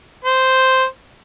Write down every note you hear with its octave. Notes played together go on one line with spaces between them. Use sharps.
C5